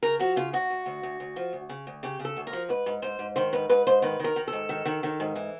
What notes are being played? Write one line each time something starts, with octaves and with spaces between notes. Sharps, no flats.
C#3 A#4
F3 F#4
C#3 F4
D2 F#4
D2
D2
D2
D2
F3
D2
C#3
D2
C#3 G4
C#3
A4
D2
A#4
F3
G#2 B4
G#2
G#2 C5
G#2
D#3 C5
G#2 B4
G#2 B4
G#2 C5
D#3 B4
D#3 A#4
D#3
A4
G#2
D#3
D#3
D#3
G#2
E3